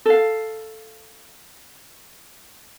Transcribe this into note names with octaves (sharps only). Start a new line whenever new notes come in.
A4 F5